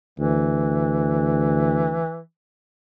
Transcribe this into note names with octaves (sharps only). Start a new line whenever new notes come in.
D2 E3